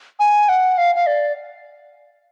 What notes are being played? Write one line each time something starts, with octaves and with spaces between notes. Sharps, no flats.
G#5
F#5
F5
F5
D5